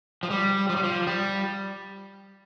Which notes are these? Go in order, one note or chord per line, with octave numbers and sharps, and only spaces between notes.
F3
G3
F3
G3
F3
G3